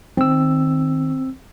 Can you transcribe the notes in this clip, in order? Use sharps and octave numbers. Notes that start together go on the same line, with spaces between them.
D#3 C4 E6